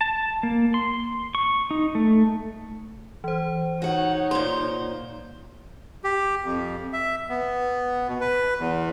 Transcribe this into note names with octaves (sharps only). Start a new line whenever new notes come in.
A5
A#3
C6
C#6
D#4
A3
E3 C5
D#4 F#4 C#5 F#5
A#2 C5 C6
G4
F2
E5
B3
B2
B4
E2